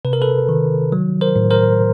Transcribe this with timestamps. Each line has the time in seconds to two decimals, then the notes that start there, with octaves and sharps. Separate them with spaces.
0.05 C3 B4
0.13 A#4
0.22 A4 B4
0.49 D#3
0.92 F#3
1.21 A#4 C5
1.36 A2
1.50 A#4 C5